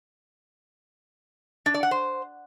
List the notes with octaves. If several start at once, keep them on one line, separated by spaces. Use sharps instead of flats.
D4
D5
F#5
C5